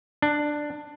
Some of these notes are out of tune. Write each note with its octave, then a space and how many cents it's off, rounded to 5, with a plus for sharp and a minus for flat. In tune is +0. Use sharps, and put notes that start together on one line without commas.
D4 +10